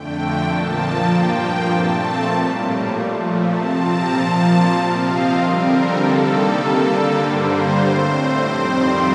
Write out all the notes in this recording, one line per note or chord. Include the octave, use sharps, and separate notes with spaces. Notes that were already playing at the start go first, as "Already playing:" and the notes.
Already playing: F2 D3 A3 G5
A#2 F3 A#3 A5
G2 F3 A#3 G5
A#2 A3 C4 A5
A2 G3 A#3
A#2 F3 A3
C3 F3 C4 A5
A#5
A#2 F3 A#3 A5
C3 F3 C4 F5
D#5
D3 G3 C4 A#4
A4
C3 D#3 G3 A#3
D3 G3 A#3
G2 D3 G3 A#3 C5
A2 A3 C4
F2 D#3 G3 C4